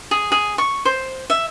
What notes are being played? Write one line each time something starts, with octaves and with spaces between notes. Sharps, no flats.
G#4
G#4
C#6
C5
E5